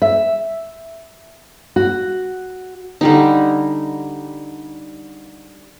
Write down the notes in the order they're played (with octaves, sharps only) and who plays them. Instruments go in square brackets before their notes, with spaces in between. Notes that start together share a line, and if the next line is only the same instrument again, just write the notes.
[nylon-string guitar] E5
F#4
[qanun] D3 G3 D#4